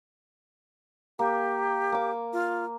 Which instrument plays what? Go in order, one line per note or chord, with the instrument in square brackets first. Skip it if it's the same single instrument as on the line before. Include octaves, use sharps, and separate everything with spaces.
[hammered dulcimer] A#3 [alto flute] G4
[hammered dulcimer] A#3 D6
[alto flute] F4